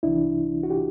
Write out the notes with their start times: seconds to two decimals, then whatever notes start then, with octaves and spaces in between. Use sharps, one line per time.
0.03 C2 C3 E3 D4 E4
0.63 F#4
0.70 F4 G4